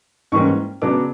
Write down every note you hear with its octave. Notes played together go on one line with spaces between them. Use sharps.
G#2 E3 G3 A#3 C#4 C#6
C#3 F#3 B3 D4 D6